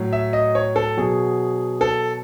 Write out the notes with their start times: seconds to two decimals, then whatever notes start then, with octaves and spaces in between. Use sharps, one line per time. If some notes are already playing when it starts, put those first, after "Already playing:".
Already playing: A2 F#3
0.13 E5
0.33 D#5
0.55 C#5
0.76 A4
0.97 B2 F#3 G#4
1.81 A4